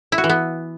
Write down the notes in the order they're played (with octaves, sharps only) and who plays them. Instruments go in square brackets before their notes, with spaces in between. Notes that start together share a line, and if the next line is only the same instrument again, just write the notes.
[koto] E4
F#4
E3
B3